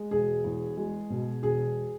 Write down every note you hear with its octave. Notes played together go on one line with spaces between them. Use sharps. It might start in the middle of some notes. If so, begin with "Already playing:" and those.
Already playing: G#3
E1 G#4
E2
G#3
B2
E1 G#4